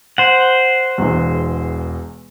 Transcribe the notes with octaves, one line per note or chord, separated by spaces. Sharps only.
C5 F#5
E1 E2